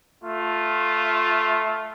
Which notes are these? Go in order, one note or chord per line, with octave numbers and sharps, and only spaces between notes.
A3 F4